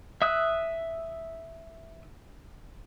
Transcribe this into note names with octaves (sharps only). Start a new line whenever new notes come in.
E5 D#6 E6 F#6